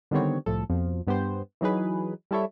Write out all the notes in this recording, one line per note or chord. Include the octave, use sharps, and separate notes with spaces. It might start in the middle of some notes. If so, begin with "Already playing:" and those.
D3 D#3 G3 B3 C4 C#5
C2 A2 F3 A4
F2 B2 F3
G2 B3 G4 C5
E3 F#3 D#4 G#4 B4
G3 E4 A4 C#5 E5